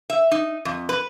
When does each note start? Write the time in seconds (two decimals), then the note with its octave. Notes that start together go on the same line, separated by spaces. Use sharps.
0.10 E5
0.31 D#4
0.65 F2
0.89 B4